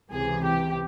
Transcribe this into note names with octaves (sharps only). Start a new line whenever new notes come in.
C#2 C3 E3 G#4
G4